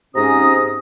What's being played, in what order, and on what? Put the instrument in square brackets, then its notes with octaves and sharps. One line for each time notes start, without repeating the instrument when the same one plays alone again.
[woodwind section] G#2 C3 C#4 A#5 D#6